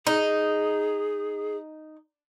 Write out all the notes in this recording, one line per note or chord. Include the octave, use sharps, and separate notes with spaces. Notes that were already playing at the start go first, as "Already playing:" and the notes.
D#4 G#4